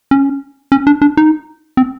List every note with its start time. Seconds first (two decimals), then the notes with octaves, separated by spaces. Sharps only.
0.11 C#4
0.72 C#4
0.87 D4
1.02 D4
1.17 D#4
1.77 C4